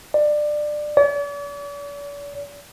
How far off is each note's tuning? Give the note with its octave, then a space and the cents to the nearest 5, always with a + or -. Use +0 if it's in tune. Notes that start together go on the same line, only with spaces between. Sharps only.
D5 +20
D5 -45